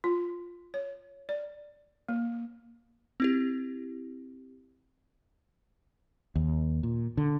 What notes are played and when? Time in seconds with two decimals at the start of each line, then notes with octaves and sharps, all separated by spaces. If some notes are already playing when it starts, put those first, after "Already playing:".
0.04 F4
0.74 C#5
1.29 D5
2.08 A#3
3.20 C4 E4 G4
6.35 D#2
6.83 A#2
7.17 D3